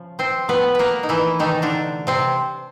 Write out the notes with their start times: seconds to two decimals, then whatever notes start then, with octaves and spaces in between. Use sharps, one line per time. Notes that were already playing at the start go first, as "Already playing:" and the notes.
Already playing: C#3 F3
0.19 C4 C5
0.48 A2 F3 A3 B3 B4
0.75 A#3 A#4 B4
1.03 D#4
1.09 E3 E4
1.39 C3 D#3 E3 A3 D#4
1.62 D3 D4
2.07 C3 C4